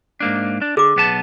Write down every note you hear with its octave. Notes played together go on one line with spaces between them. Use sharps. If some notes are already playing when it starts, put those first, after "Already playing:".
G#2 A#3 D4
D4
D3 G#4 D6
B1 B3 A5